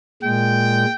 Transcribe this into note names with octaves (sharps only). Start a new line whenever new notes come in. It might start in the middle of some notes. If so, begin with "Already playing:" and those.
A#2 G#3 G5